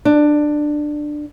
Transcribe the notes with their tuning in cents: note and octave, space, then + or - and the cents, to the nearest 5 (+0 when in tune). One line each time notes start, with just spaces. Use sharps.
D4 +15